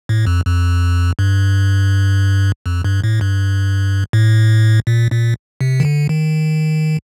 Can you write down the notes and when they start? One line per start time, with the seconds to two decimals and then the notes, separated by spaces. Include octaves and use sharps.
0.09 A2
0.27 F2
0.45 F2
1.19 G2
2.66 F2
2.84 G2
3.04 A2
3.21 G2
4.13 A2
4.87 A#2
5.12 A#2
5.61 C3
5.80 D#3
5.85 D3
6.09 D#3